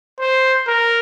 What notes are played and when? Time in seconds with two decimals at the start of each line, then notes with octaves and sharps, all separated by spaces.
0.20 C5
0.67 A#4